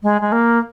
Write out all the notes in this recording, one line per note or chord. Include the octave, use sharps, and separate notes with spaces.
G#3
G#3
A#3